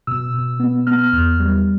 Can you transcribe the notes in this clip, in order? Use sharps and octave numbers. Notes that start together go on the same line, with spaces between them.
B2 E6
B2
B3
B3 F6
E2
G3